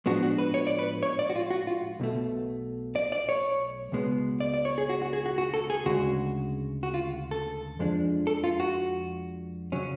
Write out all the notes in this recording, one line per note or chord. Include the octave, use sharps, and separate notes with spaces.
A2 F3 G#3 B3 D4 F#4
F#4
B4
C#5
D5
B4
C#5
D5
F#4
F4
F#4
F4
B1 B2 A3
D5
D5
C#5
C#2 B2 G#3 B3
D5
D5
C#5
G#4
F#4
F#4
G#4
F#4
F#4
A4
G#4
D2 C#3 G#3 F#4
F#4
F4
A4
F2 F3 G#3 D4
A4
F4
F#4
C#3 F#3 C#4